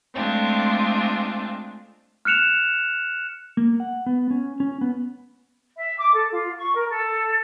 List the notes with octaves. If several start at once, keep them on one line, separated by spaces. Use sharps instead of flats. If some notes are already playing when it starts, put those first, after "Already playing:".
G#3 A3 C4 D4 F4
F6 F#6 C#7 E7 F7
A#3
F#5
B3
C#4
C#4
B3
E5
D6
A4
F4
C#6
A#4
A4